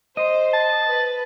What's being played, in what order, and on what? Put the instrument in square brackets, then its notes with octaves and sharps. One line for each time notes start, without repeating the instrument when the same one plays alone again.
[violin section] C5 [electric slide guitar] D#5
[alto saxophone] A5
[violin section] B4